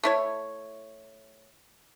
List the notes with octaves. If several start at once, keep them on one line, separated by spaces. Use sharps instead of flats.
A3 E4 C#5